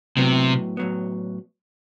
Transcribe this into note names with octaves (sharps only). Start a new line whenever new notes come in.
A2 C3 F#3 B3
A2 F#3 B3